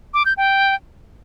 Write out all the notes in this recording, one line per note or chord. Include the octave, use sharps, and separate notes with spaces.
D6
G6
G5